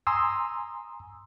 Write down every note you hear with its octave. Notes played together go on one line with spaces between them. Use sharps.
G#5 A#5 C6 D#6 E6